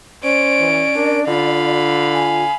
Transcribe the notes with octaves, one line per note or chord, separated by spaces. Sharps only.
C#4 C5 D5 D7
E3
D4 A#4
D3 F4 F5 B5
G#5